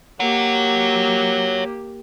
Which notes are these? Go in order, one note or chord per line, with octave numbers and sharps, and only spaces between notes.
A#3 G4 C#5 F#5